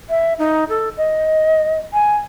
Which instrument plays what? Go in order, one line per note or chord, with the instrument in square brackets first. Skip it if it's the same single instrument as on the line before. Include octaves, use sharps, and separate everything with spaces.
[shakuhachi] E5
D#4
A4
D#5
G#5